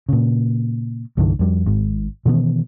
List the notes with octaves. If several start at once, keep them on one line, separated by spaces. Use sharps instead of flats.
A#2 C#3
C2 G2 D3 E3
F2 G3
G#1 G#2
B2 D#3 E3 B3